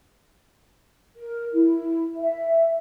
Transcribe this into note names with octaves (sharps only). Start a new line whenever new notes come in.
A#4
E4
E5